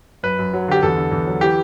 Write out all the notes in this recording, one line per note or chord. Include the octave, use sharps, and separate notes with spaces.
F#2 B4
F#2
F#3
D3 G4
E2 A4
D3
E2
F#3
E3 G4